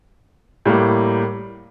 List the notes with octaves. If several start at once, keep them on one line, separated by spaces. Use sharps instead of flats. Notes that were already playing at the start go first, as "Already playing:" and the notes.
A2 G3 A#3